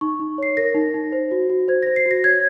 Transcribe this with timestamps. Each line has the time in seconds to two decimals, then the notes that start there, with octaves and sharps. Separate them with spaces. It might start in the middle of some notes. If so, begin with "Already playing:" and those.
0.01 D#4 C#6
0.20 D#4
0.38 C#5 C7
0.57 A#4 A#6
0.75 D#4
0.94 D#4
1.12 C5
1.31 F#4
1.50 F#4
1.68 C5 G#6
1.83 C5 A#6
1.96 C7
2.06 F#4
2.11 A#6
2.24 C#5 G#6